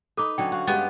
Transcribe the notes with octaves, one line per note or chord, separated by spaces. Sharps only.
D#4 A4 B4 D6 D#6
D3 F#3 C#4 G5
F#4 F5
G2 G#3 B3 G4